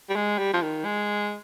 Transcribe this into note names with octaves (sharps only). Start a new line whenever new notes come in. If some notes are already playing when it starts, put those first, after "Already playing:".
G3
G#3
G3
F3
D#3
G#3